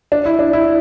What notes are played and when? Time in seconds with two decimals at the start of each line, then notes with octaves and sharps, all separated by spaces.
0.12 D4
0.25 E4
0.39 D4
0.53 E4